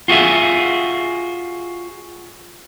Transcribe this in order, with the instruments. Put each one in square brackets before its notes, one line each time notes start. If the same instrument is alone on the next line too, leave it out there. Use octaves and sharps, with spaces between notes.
[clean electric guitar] F4 F#4 G#4 E5